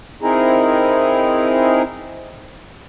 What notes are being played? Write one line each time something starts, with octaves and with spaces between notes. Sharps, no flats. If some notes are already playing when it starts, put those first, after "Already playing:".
C4 D#4 E4 G#4 A#4